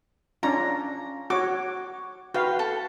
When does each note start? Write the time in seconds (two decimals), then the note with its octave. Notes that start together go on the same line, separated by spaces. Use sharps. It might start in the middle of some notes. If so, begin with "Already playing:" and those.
0.43 C#4 D4 F4 A#5
1.30 F#4 C#5 D6
2.34 F#4 B4 F5 G5
2.59 A4